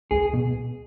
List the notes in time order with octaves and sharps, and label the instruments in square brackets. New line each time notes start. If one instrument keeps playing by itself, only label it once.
[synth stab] C#2 [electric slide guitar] G#4
[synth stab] B2